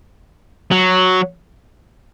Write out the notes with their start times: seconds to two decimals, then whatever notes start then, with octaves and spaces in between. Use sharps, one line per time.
0.71 F#3